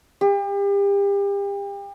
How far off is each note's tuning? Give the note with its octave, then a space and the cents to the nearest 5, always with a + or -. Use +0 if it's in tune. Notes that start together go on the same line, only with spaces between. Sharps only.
G4 +35